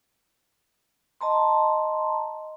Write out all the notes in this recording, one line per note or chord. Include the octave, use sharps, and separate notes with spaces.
D#5 A5 A#5 C6